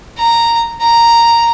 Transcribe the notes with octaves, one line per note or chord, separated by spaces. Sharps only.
A#5
A#5